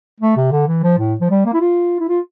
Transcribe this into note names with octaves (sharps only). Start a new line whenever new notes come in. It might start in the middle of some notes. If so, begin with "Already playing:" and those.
A3
C3
D3
E3
F3
A2
F3
G3
A#3
E4
F4
E4
F4